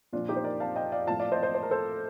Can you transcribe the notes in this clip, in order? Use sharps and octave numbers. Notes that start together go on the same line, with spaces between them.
A#2 F3 D4 F4
D#4 G4
C5
A#4 D5
F5 A5
D#5 G5
D5 F5
A2 F3 F5 A5
D5 F5
C5 D#5
C5 D#5
C5
A#4
A4 C5